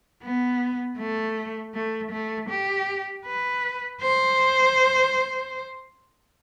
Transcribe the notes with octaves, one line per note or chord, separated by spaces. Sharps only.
B3
A3
A3
A3
G4
B4
C5